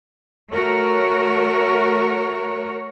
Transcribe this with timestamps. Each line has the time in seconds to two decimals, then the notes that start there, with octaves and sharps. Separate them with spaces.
0.52 A3 F#4 A#4 C#5